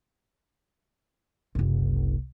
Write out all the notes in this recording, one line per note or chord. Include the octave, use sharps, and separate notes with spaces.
F#1 C2